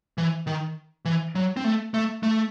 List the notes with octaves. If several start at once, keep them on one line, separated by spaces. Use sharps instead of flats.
E3
D#3
E3
F#3
C4
A3
A3
A3